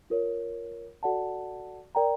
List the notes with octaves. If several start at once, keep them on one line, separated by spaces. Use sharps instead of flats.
F4 A#4 C#5
F#4 A4 D5 F#5 A5
A#4 D5 G5 A#5